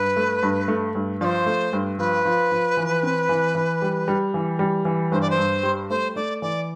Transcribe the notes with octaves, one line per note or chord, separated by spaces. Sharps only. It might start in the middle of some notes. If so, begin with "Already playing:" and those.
Already playing: G2 B4
A3
G2
A3
G2
F3 C5 D5
A3
G2
F3 B4
F3
F3
E3
C4
E3
E3
G3
G3
E3
G3
E3
G2 C5
D5
C5
G2
G3
A3 C5
A3 D5
E3 D5